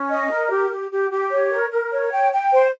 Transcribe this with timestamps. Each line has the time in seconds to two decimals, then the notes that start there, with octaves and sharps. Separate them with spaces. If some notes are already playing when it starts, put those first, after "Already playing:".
Already playing: C#4
0.10 D#5
0.30 A#4
0.50 G4
0.71 G4
0.91 G4
1.11 G4
1.30 C#5
1.51 A#4
1.71 A#4
1.91 C#5
2.11 G5
2.32 G5
2.52 C5